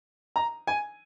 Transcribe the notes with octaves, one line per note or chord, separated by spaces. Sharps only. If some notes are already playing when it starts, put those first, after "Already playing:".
A#5
G#5